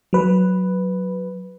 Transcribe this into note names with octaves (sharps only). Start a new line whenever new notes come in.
F#3 B4